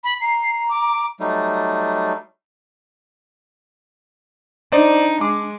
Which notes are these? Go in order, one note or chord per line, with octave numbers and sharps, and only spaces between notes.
B5
A#5 C7
D6
F#3 G3 A3 D#4
D4 D#4 C5 D5
G#3 D6